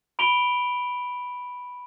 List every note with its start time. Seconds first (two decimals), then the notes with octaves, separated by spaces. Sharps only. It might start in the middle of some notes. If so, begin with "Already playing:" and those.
0.19 B5 D7 F7 G7